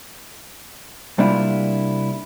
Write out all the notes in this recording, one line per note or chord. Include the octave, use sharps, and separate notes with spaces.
C3 G3 A#3 D4 E4 F4